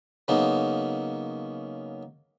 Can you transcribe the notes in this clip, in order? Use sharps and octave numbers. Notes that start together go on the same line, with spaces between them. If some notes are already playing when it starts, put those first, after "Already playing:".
C#3 F#3 A#3 B3 D#4